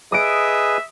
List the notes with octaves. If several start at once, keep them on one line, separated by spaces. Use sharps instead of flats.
G#4 B4 D#5 E5 D#6 C#7 D7